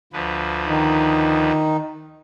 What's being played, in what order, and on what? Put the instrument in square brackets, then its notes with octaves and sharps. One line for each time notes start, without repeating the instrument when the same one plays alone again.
[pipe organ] D2 F3 B4
[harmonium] D#3 D#4